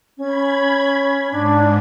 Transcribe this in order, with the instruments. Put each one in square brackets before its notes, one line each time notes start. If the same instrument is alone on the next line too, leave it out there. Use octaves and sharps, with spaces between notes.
[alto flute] C#4 [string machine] B5 G#6
[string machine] G#2 [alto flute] D4